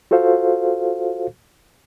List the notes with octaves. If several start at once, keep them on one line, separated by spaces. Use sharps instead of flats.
F4 F#4 A4 C5 F5